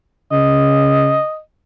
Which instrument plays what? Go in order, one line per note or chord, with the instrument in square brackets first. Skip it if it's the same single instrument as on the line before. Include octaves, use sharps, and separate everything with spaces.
[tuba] C#3 [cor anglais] D#5